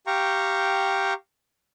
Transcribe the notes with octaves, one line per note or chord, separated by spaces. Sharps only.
G4 F5 G5 A#5 C#6